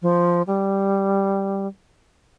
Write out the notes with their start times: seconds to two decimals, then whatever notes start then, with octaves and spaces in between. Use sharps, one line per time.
0.02 F3
0.47 G3